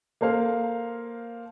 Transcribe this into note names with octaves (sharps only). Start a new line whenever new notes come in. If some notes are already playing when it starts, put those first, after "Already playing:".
A#3 A4 C5 F5